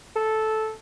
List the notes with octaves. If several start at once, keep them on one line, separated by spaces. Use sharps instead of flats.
A4